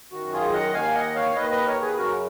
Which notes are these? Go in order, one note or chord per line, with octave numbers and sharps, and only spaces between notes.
F#2 D#3 F#4
F4 G#4
D#5 F#5
D#2 D#3 F5 G#5
D#5 F#5
C#5 F5
D#2 D#3 B4 D#5
B4 D#5
A#4 C#5
G#4 B4
F#2 C#3 F#4 A#4